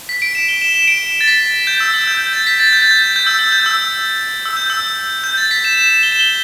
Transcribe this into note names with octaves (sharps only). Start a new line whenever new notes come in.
B6
D7
E7
G7
E7
E7
D7
A6
B6
G6
E6
E6
G6
G6
A6
B6
A6
G6
A6
G6
G6
E6
E6
G6
E6
E6
G6
E6
G6
A6
B6
E7
E7
E7
G7
E7
G7